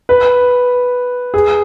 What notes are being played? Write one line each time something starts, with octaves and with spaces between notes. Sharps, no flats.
B4
G#4